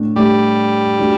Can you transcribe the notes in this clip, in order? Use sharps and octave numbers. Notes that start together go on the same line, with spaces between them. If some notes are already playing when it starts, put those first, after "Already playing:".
Already playing: A2 A3 D4
A2 G3 A3 D4 G4
F#3 A3 D4 G4